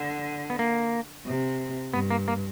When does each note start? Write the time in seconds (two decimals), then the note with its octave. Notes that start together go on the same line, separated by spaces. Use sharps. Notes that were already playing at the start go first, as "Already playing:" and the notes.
Already playing: D3
0.50 B3
0.59 A#3
1.26 C3
1.93 G2 B3
2.11 A#3
2.28 A#3